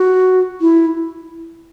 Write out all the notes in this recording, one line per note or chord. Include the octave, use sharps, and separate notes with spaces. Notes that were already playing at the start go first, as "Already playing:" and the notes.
Already playing: F#4
E4